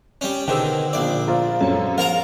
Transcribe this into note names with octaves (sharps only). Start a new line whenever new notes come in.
G3 C#4
B2 D3 D#3 G#4 C5 G5 E6
A#1 D5
F4 C5 F5 A#5
F#2 A4 C#5
F3 G#4 A#4 C5 F5 A5 A#5